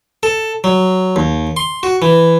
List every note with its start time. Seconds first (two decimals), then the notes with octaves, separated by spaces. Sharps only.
0.23 A4
0.64 F#3
1.16 D#2
1.57 C6
1.83 F#4
2.02 E3